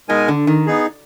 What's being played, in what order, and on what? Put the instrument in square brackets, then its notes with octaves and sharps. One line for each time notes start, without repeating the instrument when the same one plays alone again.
[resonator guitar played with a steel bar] B2 [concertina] G#3 D#4 A#4 D#5 G#5
[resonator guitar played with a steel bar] D3
D#3
[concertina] B3 D#4 G#4